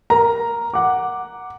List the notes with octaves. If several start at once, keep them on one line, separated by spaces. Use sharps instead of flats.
A#4 A#5
F#5 D6